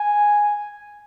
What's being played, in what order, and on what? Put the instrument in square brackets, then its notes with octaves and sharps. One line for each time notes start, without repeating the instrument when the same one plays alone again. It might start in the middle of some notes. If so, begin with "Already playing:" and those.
Already playing: [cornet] G#5